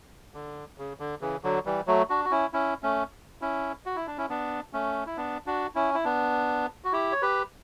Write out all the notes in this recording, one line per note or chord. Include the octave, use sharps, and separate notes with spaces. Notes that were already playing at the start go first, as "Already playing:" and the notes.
D3
C#3
D3
C#3 E3
D3 F#3
E3 G3
F#3 A3
D4 F#4
F#4
C#4 E4
C#4 E4
A3 C#4
C#4 E4
F#4
E4
D4
C#4 E4
B3 D4
A3 C#4
E4
B3 D4
D4 F#4
C#4 E4
E4
B3 D4
F#4
E4 G4
C#5
G4 B4